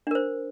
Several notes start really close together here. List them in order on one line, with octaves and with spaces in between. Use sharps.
D4 A#4 C5